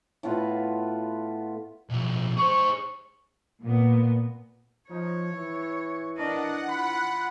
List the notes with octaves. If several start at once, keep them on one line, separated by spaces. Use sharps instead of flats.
A2 B3 F4 B4
B1 F3
G#4 C5 C#6
A#2 B3
F3 D#4 C#5
E3 E4
D4 A#4 D#5 F#5
F4 B5